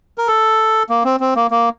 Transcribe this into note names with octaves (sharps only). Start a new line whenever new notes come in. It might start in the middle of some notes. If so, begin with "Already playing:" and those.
A#4
A4
A#3
C4
C4
A#3
A#3